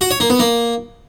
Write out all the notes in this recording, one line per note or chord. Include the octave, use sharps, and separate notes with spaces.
F#4
C#5
A#3
B3
A#3